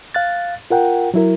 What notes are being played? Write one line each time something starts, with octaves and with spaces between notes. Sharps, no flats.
F5 F#6 A6
F4 A#4 F#5 G5
F#3 E4 A#4